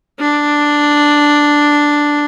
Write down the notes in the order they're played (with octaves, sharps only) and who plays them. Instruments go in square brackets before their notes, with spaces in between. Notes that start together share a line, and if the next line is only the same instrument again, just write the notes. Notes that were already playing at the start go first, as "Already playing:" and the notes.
[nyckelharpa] D4